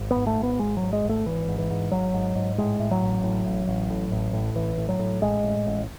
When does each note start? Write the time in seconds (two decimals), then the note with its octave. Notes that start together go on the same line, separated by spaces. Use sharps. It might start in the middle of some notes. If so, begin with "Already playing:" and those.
Already playing: G#1
0.11 B3
0.16 G#2
0.27 A3
0.39 G#1 B3
0.59 G#1 G#3
0.77 F#3
0.82 G#1
0.93 G#3
1.04 G#1 A3
1.26 G#1 E3
1.48 G#2
1.58 E3
1.70 G#2
1.92 G#1 F#3
2.14 G#2
2.35 G#2
2.58 A2 G#3
2.79 A2
2.91 F#3
3.02 A1
3.24 A2
3.46 A1
3.67 A1
3.90 A2
4.12 A1
4.33 A2
4.55 A1 E3
4.78 A2
4.89 F#3
4.99 A2
5.21 A1 G#3
5.44 A2
5.66 A1